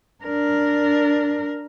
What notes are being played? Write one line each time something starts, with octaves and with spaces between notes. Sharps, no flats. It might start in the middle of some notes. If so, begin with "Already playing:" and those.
D4 A#4